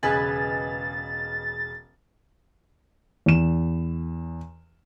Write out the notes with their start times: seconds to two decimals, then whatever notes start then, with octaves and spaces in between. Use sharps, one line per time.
0.03 E1 C#3 B4 D#5 G#5 A6
3.26 E2 E7